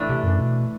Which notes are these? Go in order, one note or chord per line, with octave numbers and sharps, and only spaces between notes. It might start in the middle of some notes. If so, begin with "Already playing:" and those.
Already playing: A2 E3 A3 D4
C3
F#2
B2